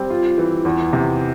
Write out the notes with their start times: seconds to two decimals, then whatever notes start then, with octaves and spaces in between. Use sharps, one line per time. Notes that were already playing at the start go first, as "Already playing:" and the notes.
Already playing: G3 C4
0.10 F4
0.38 E3
0.65 E2
0.93 C3